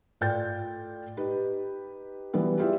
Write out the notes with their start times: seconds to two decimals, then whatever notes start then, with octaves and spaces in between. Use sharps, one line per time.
0.21 A2 F4 D5 G5 G6 A6
1.17 D#4 G4 B4
2.34 E3 F#3 G3 B3
2.59 E4 F4 G4 G#4 D5 E5